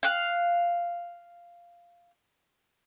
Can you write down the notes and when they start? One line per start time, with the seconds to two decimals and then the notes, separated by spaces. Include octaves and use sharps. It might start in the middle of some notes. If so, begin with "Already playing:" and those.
0.03 F5 F#6